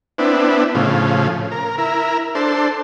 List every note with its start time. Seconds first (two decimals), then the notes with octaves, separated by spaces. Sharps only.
0.18 B3 C4 D4 E4
0.75 A2 C#3 F3
1.51 A#4
1.78 E4 A#4
2.35 D4 A4 C5